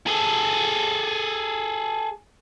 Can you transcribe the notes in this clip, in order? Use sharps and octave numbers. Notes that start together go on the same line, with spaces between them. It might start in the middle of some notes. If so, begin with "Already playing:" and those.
G#4 A4